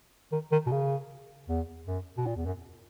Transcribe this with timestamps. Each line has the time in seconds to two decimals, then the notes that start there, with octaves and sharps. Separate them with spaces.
0.32 D#3
0.52 D#3
0.67 B2
0.72 C#3
1.49 E2
1.87 F#2
2.18 B2
2.26 A#2
2.36 E2
2.46 F#2